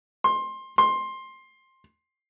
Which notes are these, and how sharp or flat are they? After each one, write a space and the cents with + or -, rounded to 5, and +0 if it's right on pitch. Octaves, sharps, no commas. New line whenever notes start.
C6 +20
C6 +15